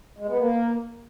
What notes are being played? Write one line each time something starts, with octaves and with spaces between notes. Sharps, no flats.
G#3
B3
A#3